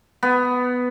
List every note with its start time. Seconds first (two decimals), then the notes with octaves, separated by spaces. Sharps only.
0.23 B3